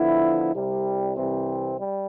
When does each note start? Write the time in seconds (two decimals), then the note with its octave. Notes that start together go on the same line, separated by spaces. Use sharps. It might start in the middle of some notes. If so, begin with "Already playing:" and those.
Already playing: D3 F3 B3 E4
0.53 C2 C3 G3
1.14 C2 C3 E3 G3 C4
1.76 G3